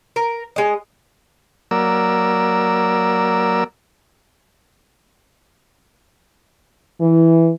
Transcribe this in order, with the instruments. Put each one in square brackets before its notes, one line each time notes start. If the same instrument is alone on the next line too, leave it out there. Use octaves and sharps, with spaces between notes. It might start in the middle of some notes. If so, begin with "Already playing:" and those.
[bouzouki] A#4
G#3 D#5
[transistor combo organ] F#3 A#3 A#4 D5 E6
[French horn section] E3